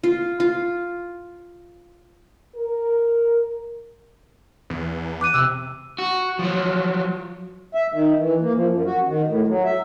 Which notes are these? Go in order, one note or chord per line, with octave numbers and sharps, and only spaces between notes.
F4
F4
A#4
E2
D6 F#6 D#7
C3 E6
F#4
F3 F#3
E5
D#3
E3
A#3
F3
F#2
F#4
D#3
A2
F#3
E5